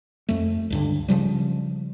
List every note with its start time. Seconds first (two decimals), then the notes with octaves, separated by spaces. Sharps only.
0.29 F2 A3
0.70 C#2 G2 D3
1.08 C#3 F3 G3